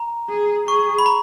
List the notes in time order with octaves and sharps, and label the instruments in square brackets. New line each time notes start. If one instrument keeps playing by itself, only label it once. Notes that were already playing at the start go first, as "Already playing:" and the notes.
Already playing: [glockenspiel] A#5
[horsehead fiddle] G#4
[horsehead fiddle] G#4 [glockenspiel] C#6
[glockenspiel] B5
A#5